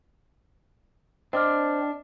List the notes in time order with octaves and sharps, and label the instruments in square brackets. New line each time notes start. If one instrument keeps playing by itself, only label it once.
[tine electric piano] C4 [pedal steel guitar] D4 [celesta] D#5 D6 F6